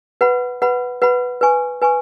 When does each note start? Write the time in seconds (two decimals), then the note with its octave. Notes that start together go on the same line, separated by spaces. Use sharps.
0.21 B4 F#5 B5
0.62 B4 F#5 B5
1.02 B4 F#5 B5
1.41 B4 G#5 C#6
1.82 B4 G#5 C#6